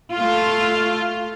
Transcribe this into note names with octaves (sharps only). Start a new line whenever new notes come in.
A3 F4